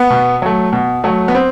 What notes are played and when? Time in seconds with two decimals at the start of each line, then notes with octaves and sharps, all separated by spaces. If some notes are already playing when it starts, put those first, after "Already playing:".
Already playing: B3
0.10 B2
0.42 F#3 A3
0.73 B2
1.04 F#3 A3
1.28 B3
1.35 C4